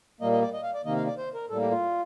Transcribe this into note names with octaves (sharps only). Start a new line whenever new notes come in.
A#2 G3 A#3 D#5
D#5
D5
D#5
F5
D5
C3 D#3 A#3 D#5
F5
D5
C5
A#4
A2 G3 A#3 A4
G4
F4